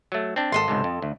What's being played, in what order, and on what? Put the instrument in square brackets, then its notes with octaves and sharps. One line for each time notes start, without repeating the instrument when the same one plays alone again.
[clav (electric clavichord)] F#3 A3
C4 D4
[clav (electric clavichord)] G#1 [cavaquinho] A4 D#5 C6
[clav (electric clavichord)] C#2 G#2 C3
F2
D2